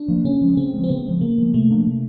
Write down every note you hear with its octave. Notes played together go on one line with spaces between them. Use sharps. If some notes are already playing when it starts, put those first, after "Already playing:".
Already playing: D4
F3 A#3
C#3 C#4
F3 G#3
C#3 C4
F3 G#3
C4
C#3 B3
F3 G#3
C#3 A#3
F3 G#3
C3 A3
F3 A#3 D4
C3